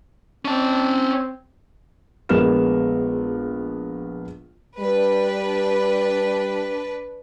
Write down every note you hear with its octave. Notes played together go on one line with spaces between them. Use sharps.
C4 C#4 A5
A#1 G#3 B3 A#4 F6 E7
G3 D4 B4